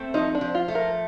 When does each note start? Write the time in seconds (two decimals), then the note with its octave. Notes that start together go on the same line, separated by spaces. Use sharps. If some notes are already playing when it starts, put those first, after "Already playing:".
Already playing: A3 C4
0.14 F3 D#4
0.35 D4
0.41 F3
0.55 F4
0.68 A3
0.75 A#4